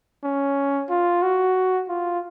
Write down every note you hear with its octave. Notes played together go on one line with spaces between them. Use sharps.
C#4
F4
F#4
F4